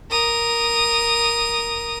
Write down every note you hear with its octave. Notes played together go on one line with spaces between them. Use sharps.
A#4 D#6